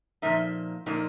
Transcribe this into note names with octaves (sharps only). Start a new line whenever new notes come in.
A#2 F3 A#3 D#4 E5
A#2 F3 A#3 D#4